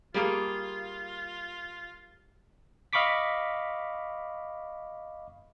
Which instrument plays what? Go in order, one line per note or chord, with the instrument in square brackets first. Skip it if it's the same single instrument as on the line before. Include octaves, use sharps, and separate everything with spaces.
[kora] G3 A#3 G#4 [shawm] F4
[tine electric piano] D#5 F5 B5 C#6 D6 B6